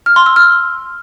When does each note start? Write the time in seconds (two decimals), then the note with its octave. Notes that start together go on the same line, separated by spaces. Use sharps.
0.06 F6
0.16 C6
0.26 E6
0.36 F6